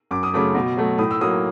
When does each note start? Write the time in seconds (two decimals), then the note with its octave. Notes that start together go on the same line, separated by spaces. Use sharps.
0.11 F#2 D6
0.23 D#6
0.34 C#3 F#3 A3 D6
0.55 B2
0.77 F#3 A3
0.98 A2 D#6
1.11 E6
1.21 F#3 A#3 D#6